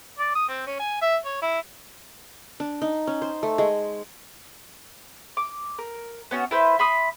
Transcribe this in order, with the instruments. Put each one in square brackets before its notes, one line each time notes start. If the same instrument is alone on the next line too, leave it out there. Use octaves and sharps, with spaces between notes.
[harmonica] D5
D#6
C4
C#4
G#5
E5
C#5
E4
[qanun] D4
D#4
C#4
C5
A3
G#3
[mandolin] D6
A#4
B3 C#4 F#4
E4 B4 C5
E5 B5 C6 D#6